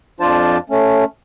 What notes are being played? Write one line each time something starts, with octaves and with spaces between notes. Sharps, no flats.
F2 F3 D4 F4 C5 A5
A3 C#4